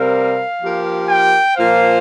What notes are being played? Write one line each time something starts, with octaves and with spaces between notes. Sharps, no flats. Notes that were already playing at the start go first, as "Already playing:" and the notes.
Already playing: C3 G3 C4 A#4 F5
F3 A#3 G4 A#4
G5
A#2 F3 A#3 F4 C5 F5